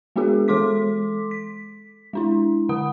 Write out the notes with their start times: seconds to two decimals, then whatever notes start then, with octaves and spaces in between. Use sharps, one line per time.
0.16 G#3 B3 D4 F#4 G#4 A#4
0.48 E3 G#3 A4 C6 D6 B6
1.31 B6
2.13 G#3 D4 E4
2.69 D3 F#5 B5 D#6